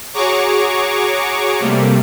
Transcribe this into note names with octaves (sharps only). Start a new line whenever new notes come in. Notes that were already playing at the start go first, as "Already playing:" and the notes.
F#4 G#4 C#5 A#5 C#6 D6
C3 G3 A3 A#3